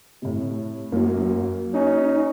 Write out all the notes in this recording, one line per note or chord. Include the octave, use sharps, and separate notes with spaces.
A2 C3
F#2 F#3 A#3
C#4 D#4